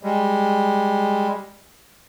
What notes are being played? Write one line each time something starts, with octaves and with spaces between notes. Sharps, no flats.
G3 G#3